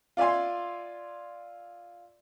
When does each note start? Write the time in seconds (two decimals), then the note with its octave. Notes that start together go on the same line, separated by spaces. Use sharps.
0.17 F4 D5 E5 G#5 C6